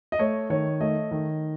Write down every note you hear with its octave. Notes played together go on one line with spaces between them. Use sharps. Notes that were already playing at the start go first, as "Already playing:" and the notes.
D#5
A3 C#5
D#3 C#5
A3 D#5
D#3